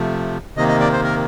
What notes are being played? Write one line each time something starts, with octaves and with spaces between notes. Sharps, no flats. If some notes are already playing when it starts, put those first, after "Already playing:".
Already playing: C3 F3 A3
C3 D#3 A#3 D#5
D#5
D5
C5
A#4